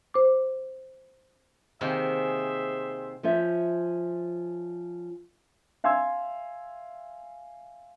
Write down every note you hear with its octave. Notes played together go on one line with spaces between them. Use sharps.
C5 D6
C3 D#3 A#3 G#4 C5 E5
F3 C#4 F4 C5 E5
E5 F5 G#5 C6 E6 G#6